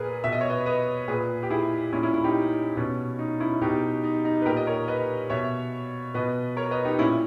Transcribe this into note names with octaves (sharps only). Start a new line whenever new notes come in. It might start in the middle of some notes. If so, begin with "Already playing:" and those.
Already playing: A#2 G#4 A#4 B4
B2 E5
D#5
C#5
B4 D#5
B4 D#5
A#2 G#4 B4
G4
E4 G#4
A#2 C#4 E4
C#4 E4
C#4 E4
D#4 G4
B2 C#4
D#4
C#4 E4
B2 D#4 G4
D#4
D#4
B4
A#2 G4 A#4
D#5
A#4 C#5
B4 D#5
B2 C#5 E5
B2 B4 D#5
A#4 C#5
B4 D#5
D#4 G4
A#2 C#4 E4